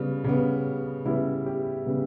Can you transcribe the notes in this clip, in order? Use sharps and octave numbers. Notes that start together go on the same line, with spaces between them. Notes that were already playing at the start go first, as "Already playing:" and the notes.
Already playing: C#3 G3 B3
C#3 G3 B3
C#3 G3 B3 E4
G4
C#3 G3 B3